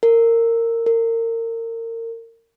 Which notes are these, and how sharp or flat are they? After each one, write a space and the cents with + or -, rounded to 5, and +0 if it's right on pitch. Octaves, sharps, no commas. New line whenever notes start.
A#4 -20
A#4 -30